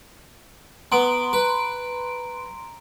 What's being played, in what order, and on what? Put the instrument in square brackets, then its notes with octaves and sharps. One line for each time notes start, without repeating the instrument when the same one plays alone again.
[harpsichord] B3 [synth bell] A#5 C6 D7
[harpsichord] B4